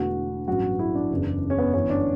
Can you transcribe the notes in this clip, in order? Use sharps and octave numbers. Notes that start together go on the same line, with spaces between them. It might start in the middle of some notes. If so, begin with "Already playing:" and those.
Already playing: E1 E2 D3 A3 F#4
A1 G2 F#3 F#4
E4
D4
F#1 E2 C#3
C#4
B3
G1 F#2 E3 B3 C#4
D4